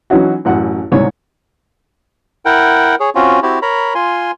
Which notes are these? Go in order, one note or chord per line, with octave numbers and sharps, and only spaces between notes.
E3 F#3 C#4 D#4 F#4
A1 F#2 F#5
C2 G#2 C3 C#5
E4 A#4 F#5 G5
G#4 C#5
C4 C#4 F4 F#4
C4 E4 F#4 G4
A#4 C#5 A#5 B5
F4 G#5 C6